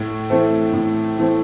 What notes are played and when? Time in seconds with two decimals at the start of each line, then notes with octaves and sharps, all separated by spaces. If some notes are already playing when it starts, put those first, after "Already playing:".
Already playing: A2
0.30 E3 A3 C4
0.73 A2
1.18 E3 A3 C4